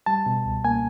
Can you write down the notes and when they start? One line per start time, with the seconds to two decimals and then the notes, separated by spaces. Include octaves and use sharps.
0.06 G3 A5
0.26 B2
0.45 C#2
0.65 A#3 G#5